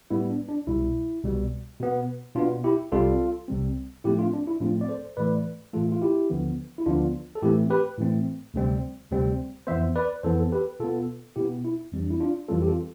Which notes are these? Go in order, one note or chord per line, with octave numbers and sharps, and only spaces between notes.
A2 G3 B3 E4
D4
D4
C2 B2 G3 E4
C2 B2 G3
B2 B3
B2 B3 D4 F4
E4 G4
C2 C3 G3 C4 F4 A4
C2 C3 G3 C4
A2 F3 A3 C4 E4 G4
D4 F4
D4
E4
A2 F3 A3 C4 D4 F4
D5
A4 C5
A2 E3 A3 B4 D5
A2 E3 A3 F4 A4
F4
E4 G4
D2 D3 F3 B3
E4
D2 D3 F3 B3 D4 F4
A4
A2 E3 A3 C4 E4 G4
G4 B4
A2 E3 A3 C4
D2 C3 G3 C4
D2 C3 G3 C4
F2 E3 B3 C5 E5
B4 D5
F2 E3 B3 A4 C5
A4
G4 B4
B2 B3 F4 A4
B2 B3 E4 G4
E4
F2 E3 G3 C4
D4
E4
D4 F4
F2 E3 G3 C4 F4 A4
G4
F4 A4